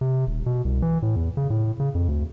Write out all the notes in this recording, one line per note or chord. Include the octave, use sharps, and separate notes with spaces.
C3
D#1
B2
C2
E3
A2
E2
C#3
A2
C#3
F2
D2